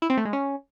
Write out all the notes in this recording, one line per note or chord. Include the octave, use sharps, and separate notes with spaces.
E4
C4
A3
G#3
C#4